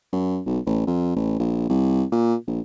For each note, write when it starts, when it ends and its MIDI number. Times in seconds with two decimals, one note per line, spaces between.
0.13 0.40 42
0.46 0.59 35
0.66 0.87 33
0.87 1.15 41
1.16 1.36 33
1.39 1.67 34
1.69 2.04 36
2.12 2.34 46
2.47 2.60 34